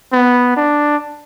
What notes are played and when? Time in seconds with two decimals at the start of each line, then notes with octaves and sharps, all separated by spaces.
0.13 B3
0.57 D4